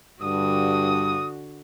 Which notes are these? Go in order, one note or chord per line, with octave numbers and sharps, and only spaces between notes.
G2 D3 F#4 D#6